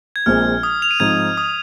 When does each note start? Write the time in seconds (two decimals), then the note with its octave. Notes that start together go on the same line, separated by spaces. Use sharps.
0.16 G#6
0.26 A#1 A#2 F3 G#3 C4 F6
0.63 D#6
0.82 F7
0.91 D#7
1.00 G#2 F3 C4 D#4 G#6
1.37 D#6